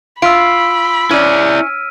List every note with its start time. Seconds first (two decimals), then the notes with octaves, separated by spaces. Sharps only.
0.22 F4 B5 E6 B6 D7
1.11 C#4 E4 D5 F6 D#7